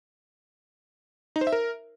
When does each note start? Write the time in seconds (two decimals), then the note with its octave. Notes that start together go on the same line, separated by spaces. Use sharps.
1.36 D#4
1.41 C5
1.47 E5
1.52 A#4